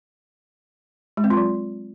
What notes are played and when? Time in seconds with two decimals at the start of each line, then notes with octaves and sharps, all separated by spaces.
1.17 G#3
1.24 C4
1.30 F4
1.37 F#3